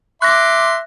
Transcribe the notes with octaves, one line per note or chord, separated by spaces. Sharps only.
E5 C6 D6 F#6 A#6